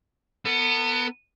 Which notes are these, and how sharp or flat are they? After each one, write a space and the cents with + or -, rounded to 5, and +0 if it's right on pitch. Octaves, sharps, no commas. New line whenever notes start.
B3 +0 A4 +45